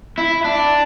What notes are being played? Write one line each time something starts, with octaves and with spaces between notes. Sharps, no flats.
E4
D4